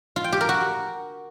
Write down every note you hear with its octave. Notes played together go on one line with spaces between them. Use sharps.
F4
G5
G4
A#4
F#4